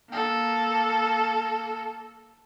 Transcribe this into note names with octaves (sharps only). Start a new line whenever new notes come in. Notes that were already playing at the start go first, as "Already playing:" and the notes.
A#3 A4